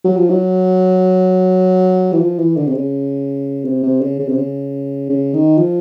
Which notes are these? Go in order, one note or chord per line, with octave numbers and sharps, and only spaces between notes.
F#3
F3
F#3
E3
F3
E3
D3
C3
C#3
C3
C3
C#3
C#3
C3
C#3
C#3
D#3
F3